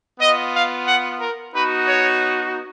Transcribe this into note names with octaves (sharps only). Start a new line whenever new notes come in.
B3 F4 D#5
F5
F#5
A#4
B3 D#4 F#4 B4
C#5